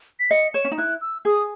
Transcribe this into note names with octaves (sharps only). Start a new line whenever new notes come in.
B6
D#5 C#7
C#5 E7
C#4
D#4
E4 F#6
E6
G#4 D#6